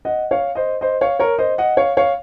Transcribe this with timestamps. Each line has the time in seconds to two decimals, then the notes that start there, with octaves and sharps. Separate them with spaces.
0.05 D#5 F#5
0.31 C#5 F5
0.55 C5 D#5
0.81 C5 D#5
1.01 C#5 F5
1.20 A#4 C#5
1.38 C5 D#5
1.58 D#5 F#5
1.77 C#5 F5
1.97 C#5 F5